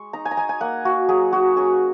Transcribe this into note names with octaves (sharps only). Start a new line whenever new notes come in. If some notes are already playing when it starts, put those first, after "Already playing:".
Already playing: G#3 C#6
D#4 A#5
G#5
A#5
D#4 G#5
G#5
A#3 F#5
A#3 F#4
F#3 G#4
D#4 F#4
C#4 G#4